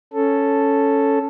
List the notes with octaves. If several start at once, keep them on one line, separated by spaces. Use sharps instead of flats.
C#4 A4